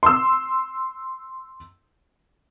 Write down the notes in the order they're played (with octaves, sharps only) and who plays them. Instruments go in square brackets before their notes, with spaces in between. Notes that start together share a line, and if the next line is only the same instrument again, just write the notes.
[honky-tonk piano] C6 E6